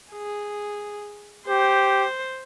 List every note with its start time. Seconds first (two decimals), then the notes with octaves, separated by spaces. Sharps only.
0.12 G#4
1.48 G4 C5